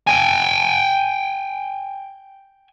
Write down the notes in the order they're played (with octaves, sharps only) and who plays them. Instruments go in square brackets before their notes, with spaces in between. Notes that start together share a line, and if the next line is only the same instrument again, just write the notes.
[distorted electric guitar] G5 G#5